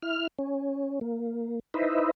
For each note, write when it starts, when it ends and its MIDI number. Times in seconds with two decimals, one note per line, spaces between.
0.02 0.27 64
0.02 0.27 89
0.39 0.99 61
1.01 1.59 58
1.74 2.11 63
1.74 2.11 64
1.74 2.11 71
1.74 2.11 72
1.74 2.11 75
1.74 2.11 76